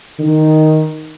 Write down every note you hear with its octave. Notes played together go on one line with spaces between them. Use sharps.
D#3